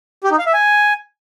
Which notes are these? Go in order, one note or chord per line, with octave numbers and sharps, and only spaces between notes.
G4
D#4
F5
E5
G#5